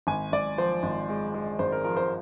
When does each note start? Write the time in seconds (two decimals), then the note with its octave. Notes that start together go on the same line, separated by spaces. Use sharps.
0.07 G#1 G#5
0.32 G#1 D5
0.58 F3 C5
0.83 G#1
1.09 G#3
1.34 G#3
1.59 G#1 C5
1.72 A#4
1.84 F3 A#4
1.97 C5